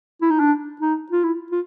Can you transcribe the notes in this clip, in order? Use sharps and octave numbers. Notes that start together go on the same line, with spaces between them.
E4
D#4
D4
D#4
F4
E4
F4